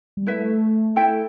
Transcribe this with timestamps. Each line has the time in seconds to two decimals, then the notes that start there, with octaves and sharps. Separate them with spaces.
0.17 G3
0.26 A3 E4 B4 E5
0.96 E4 A4 E5 G5